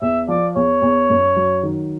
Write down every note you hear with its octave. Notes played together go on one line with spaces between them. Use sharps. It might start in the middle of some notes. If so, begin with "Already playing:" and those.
E2 E5
F3 D5
E2 C#5
E2
F#2
F#3
D#3